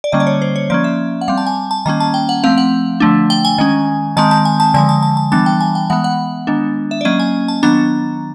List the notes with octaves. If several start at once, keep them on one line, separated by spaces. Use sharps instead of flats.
D5
D3 G3 A#3 C#4 D#5
D5
C#5
C5
C#5
F3 A#3 C#4 D5
E5
F#5
G3 C4 F5
A5
G#5
A5
D#3 G3 A#3 C#4 A#5
A5
G5
F#5
F3 A3 C4 F5
F#5
D3 F3 A3 D4
G5
G#5
D#3 G#3 C#4
D#3 G#3 C4 A5
A5
G#5
A5
D3 F3 G#3 G#5
A5
A5
A5
E3 G3 B3 D4 A5
G5
G#5
G5
E3 G#3 B3 F#5
F#5
D#3 G#3 B3 D4
E5
D5
F#3 A#3 C#4 D#5
G#5
A5
D#3 F#3 B3 D4 A#5